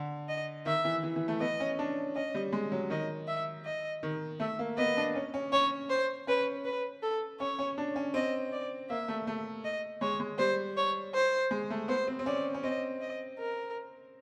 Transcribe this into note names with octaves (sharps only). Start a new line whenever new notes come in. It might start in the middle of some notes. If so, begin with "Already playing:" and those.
Already playing: D3
D#5
D#3 E5
E3
E3
E3
A3
B3 D#5
C#4
D4
C#4 D#5
G3
G#3
F#3
D#3 D#5
E5
D#5
D#3
A3 E5
A#3
B3 D#5
D4
C#4
C#4
C#4 C#5
C5
C#4 B4
B4
A4
C#4 C#5
C#4
D4
C#4
C4 D#5
D5
A#3 E5
A3
A3
D#5
G#3 C#5
G#3
G3 C5
C#5
C5
G#3
A3
B3 C5
C4
C4
C#4 D5
C#4
C4 D#5
D#5
A#4